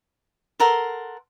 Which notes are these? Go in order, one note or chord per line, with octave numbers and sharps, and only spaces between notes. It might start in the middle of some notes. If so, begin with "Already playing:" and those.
A4 A#4 F#5 C6